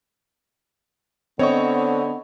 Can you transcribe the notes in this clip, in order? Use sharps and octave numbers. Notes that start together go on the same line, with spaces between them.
D3 B3 C4 C#5 D#5 C#6